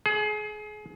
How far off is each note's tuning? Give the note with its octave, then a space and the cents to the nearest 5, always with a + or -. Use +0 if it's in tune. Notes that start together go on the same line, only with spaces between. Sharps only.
G#4 +30